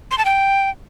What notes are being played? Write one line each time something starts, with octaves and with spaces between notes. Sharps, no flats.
C6
A5
G5